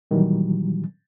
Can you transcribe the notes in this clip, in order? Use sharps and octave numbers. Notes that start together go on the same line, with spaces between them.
A#2 D#3 E3 F#3 G3